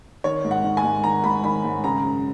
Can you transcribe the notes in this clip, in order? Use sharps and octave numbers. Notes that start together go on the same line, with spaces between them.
D#3 C#5
G#2
F#5
D#3
G#5
G#2
D#3 A#5
G#2 B5
D#3 B5
G#2
C#3 A#5
F#2